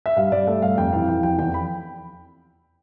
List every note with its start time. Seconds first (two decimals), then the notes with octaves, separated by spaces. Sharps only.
0.06 E5
0.16 G2 F5
0.32 G2 D5
0.47 A3 E5
0.62 G2 F5
0.77 F2 G5
0.93 E3 F5
1.08 E3 G5
1.23 F2 G5
1.38 E2 G5
1.54 B5